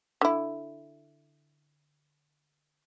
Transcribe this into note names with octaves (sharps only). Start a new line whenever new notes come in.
D3 E4